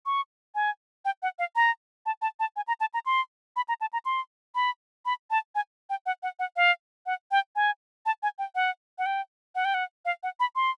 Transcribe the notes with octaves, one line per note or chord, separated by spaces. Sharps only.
C#6
G#5
G5
F#5
F5
A#5
A5
A5
A5
G#5
A#5
A5
A#5
C6
B5
A#5
A5
A#5
C6
B5
B5
A5
G#5
G5
F#5
F#5
F#5
F5
F#5
G5
G#5
A5
G#5
G5
F#5
F#5
G5
F#5
G5
F#5
F5
F#5
B5
C6